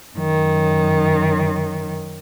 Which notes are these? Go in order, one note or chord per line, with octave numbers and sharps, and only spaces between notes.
F#2 D#3